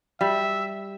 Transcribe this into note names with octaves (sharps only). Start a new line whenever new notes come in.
G3 E5